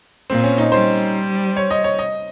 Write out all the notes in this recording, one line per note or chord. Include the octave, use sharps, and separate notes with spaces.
A#2 C4
C#4
D#4
G3 C5
C#5
D#5
C#5
D#5